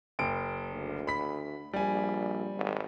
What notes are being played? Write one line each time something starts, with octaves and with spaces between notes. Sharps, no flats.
F#1 D7
D2
B5 B6
A#1 G3 G#5
G#1